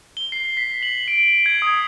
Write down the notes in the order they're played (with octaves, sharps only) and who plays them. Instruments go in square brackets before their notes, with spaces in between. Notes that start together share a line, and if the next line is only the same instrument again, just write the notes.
[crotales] G7
C7
B6
F#7
D7
G#6
D#6